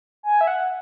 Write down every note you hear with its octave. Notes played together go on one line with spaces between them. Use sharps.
G#5
E5
F#5